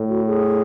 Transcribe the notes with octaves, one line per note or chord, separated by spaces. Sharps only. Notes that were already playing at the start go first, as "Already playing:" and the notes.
Already playing: A2
F#4
G#4